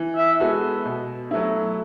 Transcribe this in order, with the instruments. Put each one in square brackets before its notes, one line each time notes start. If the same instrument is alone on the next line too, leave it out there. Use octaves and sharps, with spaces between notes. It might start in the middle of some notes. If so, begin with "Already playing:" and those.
Already playing: [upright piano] E3
[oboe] E5
[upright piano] G#3 B3 F#4 A4
B2
F#3 A3 E4